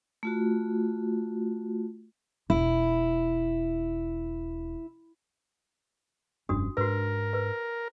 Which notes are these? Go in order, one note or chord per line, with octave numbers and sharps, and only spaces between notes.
A3 F4 F#4
E1 E4
F1 G2 C#4 D4 F#4 D#6
G#2 D4 F#4 A#4 B4
B4